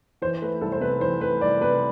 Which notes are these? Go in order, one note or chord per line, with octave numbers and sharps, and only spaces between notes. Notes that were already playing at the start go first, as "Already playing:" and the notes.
E3 C5
A3 B4
C2 A4
C5
C3 B4
E3 C5
A3 B4
C2 D5
C3 B4